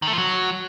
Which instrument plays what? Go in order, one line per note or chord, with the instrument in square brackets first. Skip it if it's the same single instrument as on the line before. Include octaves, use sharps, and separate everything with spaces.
[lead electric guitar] D#3
A3
F3
F#3